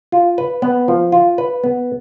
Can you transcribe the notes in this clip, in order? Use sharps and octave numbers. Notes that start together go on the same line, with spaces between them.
F4
B4
B3
F3
F4
B4
B3